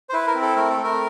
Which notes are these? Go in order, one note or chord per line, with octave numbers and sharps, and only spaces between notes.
C5
E4 B4
A#4
C4
A4
A3 A#4
A4
A3
A#4